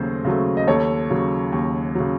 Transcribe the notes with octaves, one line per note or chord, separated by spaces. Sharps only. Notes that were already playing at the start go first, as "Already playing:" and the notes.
Already playing: D#2 C#3 F#3 A3 C5
C#3 F#3 A3
D#5
D#2 A4 C#5
C#3 F#3
D#2
C#3 F#3